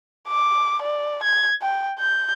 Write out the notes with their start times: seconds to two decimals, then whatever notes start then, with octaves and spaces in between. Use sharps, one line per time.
0.28 D6
0.82 D5
1.24 G#6
1.62 G5
1.99 G6